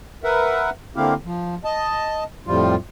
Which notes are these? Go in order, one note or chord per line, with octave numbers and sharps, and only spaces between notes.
A#4 B4 E5 F#5
D3 A#3 C4 E4 G4 F5
F3
D#5 A5
F2 A2 F3 G3 F4